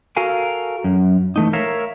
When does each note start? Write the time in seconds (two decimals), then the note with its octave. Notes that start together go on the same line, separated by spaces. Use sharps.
0.17 F#4 A4 A#4 F5 G#5
0.84 F#2
1.36 E3 A3 D#4
1.53 A#4 C#5 E5 F5